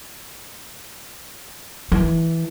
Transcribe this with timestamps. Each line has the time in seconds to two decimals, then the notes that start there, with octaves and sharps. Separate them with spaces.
1.92 E3